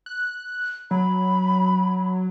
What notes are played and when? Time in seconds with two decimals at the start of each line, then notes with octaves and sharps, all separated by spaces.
0.06 F#6
0.91 F#3 B5